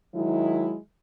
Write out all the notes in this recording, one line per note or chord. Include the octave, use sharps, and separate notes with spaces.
D#3 F#3 G#3 E4